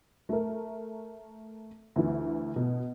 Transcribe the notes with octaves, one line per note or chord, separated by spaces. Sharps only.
A3 A#4
D2 E3
B2